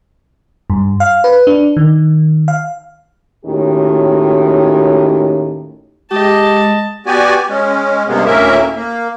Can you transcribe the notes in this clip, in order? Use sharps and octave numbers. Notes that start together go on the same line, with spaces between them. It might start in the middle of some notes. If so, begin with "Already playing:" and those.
G2
F5
B4
D4
D#3
F5
D#2 A2 D#3 C#4 F#4 G4
G#3 G4 D#5 A5
B3 F#4 G4 D5 G#5
G#3 C#4
G2 C3 G#3 A#3 B3
D2 A2 A#3 C#4 A#4 E5
A#3